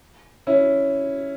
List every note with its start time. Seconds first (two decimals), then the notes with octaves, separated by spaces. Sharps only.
0.47 C#4 E4